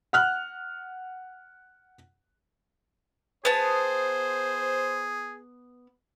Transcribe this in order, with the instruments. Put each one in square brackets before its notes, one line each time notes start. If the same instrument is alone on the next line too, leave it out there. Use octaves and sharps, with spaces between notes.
[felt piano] F#5 F6 F#6
[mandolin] B3 A5 [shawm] G#4 [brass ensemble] C5